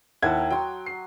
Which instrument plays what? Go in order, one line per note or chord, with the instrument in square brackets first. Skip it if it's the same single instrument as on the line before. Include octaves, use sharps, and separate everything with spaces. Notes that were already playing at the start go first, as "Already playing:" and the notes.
[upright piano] D#2 E4 G#6 [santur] F#5 G5 A5
[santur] A#5
[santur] F#3 C6 D#6 [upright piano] G5
[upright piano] C7